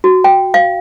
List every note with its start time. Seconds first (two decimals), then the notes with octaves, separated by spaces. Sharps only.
0.04 F#4
0.24 G5
0.54 F5